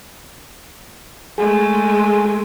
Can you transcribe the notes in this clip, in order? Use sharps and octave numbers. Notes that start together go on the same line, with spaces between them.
G#3 A3 G#4